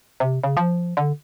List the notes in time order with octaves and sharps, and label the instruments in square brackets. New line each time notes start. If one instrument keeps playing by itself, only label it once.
[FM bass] C3
C#3
F3
D3